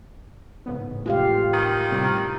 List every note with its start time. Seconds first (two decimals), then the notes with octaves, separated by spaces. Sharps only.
0.66 A1 G#2 C#3 B3
1.06 F2 C3 G#3 F4 G4 F5
1.54 D#3
1.90 A2 C3 G3